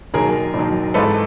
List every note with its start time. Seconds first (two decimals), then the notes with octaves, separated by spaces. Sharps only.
0.14 E1 D#2 D#3 F#3 G#4 A#4
0.54 E1 D#2 D#3 F#3
0.94 G#1 G#2 E3 G#3 A4 B4